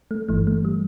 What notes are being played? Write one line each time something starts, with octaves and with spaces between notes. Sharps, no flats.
A3
G1 G2 E3 A3
A3
G3